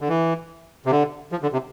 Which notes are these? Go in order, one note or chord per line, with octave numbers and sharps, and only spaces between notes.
D3
E3
C3
D3
F3
D3
C3